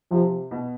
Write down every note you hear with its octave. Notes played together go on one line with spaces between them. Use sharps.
C3 F3
B2